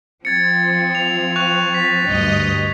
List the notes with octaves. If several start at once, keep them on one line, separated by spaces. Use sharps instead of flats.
F3 C4 G#6 A6 C#7
F7
C#6 F#6 F7
A6 B6
D2 G2 D#5